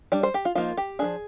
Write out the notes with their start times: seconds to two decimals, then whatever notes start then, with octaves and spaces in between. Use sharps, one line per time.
0.12 G3 D4 D5
0.23 C5
0.34 G4
0.45 F4
0.55 F3 A#3 D#4 F4
0.77 G4
0.99 F3 G#3 D4 G#4